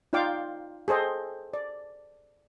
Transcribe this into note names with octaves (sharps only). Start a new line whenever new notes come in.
D#4 F4 D5 F5 G5 D6
G#4 A4 C5 D#5 G5
D5